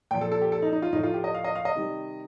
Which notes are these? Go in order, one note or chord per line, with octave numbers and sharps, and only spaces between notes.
A#2 F3 G5
A4
A4
G4
A4
D#4
D#4
F4
A2 F3 D#4
F4
G4
D#5
F5
D#5
F5
D#5
C3 D#3 G3